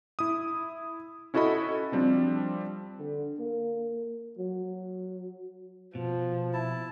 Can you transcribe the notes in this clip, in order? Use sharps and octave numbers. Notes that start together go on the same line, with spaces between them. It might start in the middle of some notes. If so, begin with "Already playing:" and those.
E4 D#6
C#4 E4 F#4 A4 D#5 B5
F3 G3 C4 D4
D3
A#3
F#3
B2 F3
E4 A5